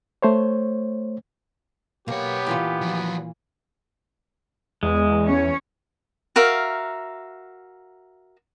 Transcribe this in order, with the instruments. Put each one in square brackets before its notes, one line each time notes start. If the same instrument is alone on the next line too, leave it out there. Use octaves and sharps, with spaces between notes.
[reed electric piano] A3 C5 C#5
[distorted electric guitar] B1 C#5 [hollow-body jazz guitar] A#3 [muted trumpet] B3 [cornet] G4
[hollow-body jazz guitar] A#2 E3 F4
[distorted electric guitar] F3 F#3
[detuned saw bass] E2 [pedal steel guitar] G#3
[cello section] C#4 C#5
[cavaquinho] F#4 A#4 E5 F5